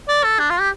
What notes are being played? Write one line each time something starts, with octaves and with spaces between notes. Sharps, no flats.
D5
A4
D4
F4
G4